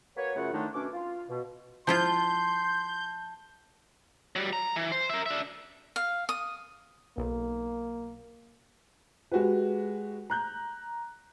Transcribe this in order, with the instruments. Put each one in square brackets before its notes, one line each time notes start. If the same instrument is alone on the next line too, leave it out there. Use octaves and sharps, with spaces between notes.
[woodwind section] A#3 F#4 B4 C#5
F#2 C#3 A3 F4 F#5
A2 D3 D#3 A3 D4 D#4
B2 A3 C#4 D4 D6
F4
B2
[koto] F3 E4 F4 [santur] A5 [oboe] C6 [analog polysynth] G6
[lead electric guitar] F#3 G3
A#5
E3
C5
A#4 E5
D4 E5
[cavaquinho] F5
D#6
[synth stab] B1 [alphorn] A#3
[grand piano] G#3 F#4 G4 B4
A#5 F#6 G6